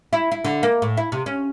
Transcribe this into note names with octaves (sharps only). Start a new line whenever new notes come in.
E4
E4
D3
A#3
A2
E4
C3
C#4